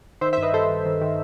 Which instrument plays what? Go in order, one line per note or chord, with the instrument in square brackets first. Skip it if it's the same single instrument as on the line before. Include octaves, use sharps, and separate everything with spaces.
[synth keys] D#3 C5 E5
G2 C5 E5
B4 D#5
G2 A4 C5
D#3
D#3
D#3